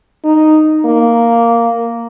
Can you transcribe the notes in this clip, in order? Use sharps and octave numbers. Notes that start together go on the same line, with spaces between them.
D#4
A#3